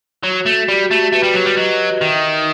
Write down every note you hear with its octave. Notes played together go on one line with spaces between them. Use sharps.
F#3 F#4
A3
G3 G4
F#4
A3 G4
A3 B4
G3
F#3
G3
F#3 D#5
D#3 E5